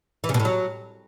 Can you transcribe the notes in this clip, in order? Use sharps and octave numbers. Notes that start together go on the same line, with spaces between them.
E3
C#3
B2
A2
F#3